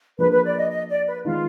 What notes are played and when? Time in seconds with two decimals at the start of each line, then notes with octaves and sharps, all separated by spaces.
0.19 F3 A#3 D4 G#4 B4
0.32 B4
0.46 D5
0.58 D#5
0.71 D#5
0.90 D5
1.07 B4
1.25 D#3 G#3 B3 D#4 F4